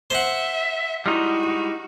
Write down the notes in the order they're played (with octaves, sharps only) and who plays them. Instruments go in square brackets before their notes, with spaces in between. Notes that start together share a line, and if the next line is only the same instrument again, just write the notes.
[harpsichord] C5 F#5 [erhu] E5
[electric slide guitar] G3 G#3 D#4 [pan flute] E4 [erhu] F#4